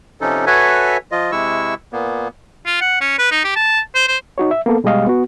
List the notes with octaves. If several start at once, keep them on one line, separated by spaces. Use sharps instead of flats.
C3 F3 C#4 D#4 A4
F#4 A4 B4 C#5 E5 G#5
F3 F4 D#5
C3 G#3 E4 C#6 E6
A#2 A#3 B3
F4
F#5
C#4
B4
D#4
G4
A5
C5
C5
D#4 F#4 C#5
E5
A#3 B3 A4
B2 G3 G#3 G4 D#5 F5
B3 F#4